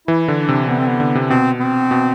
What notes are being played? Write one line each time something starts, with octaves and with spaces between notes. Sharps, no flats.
E3 E4
D3
D4
C3
C3 B3
C4
B3
D3
C3
B2 C4
C4
B2